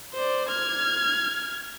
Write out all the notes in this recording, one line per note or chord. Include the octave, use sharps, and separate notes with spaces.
C5 D5
F6 G#6